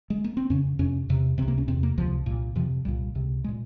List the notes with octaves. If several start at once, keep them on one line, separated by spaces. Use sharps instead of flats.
G#3
A#3
C4
F2 C#3 C#4
F2 C3 C#4
E2 C3
C#2 C3 C4
A#3
C#4
E2 C3 C4
A#3
C#2 C3 F3
C2 A#2
F2 C3 F3
C2 A#2 G3
C#2 C3
G#3
A#2